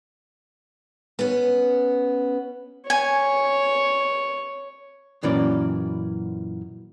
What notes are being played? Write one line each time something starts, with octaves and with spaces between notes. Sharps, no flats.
B3 C#4
C#5 G#5
F#2 A#2 E3 A#3 C#4 D5